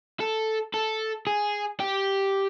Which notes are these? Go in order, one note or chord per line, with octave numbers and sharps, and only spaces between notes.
A4
A4
G#4
G4